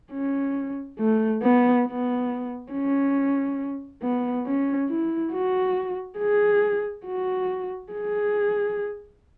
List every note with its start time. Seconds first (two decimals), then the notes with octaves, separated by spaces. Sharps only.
0.11 C#4
0.99 A3
1.42 B3
1.85 B3
2.72 C#4
4.02 B3
4.46 C#4
4.89 E4
5.32 F#4
6.18 G#4
7.06 F#4
7.92 G#4